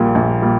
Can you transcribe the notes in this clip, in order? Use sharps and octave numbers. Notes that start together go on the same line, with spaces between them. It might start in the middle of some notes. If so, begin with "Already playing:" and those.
Already playing: A#1 A#2 G3 A#3
A#1
A#2 G3 A#3